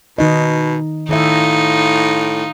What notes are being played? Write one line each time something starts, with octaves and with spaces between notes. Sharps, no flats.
B2 D#3 D#4 D#5
A2 D#3 D#4 F4 E5